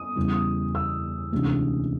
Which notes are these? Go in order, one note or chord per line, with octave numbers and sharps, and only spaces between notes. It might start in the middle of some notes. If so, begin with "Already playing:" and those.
Already playing: D#6
E2 C#3 E3 G3
E6
D2 C3 E3 G#3 C#4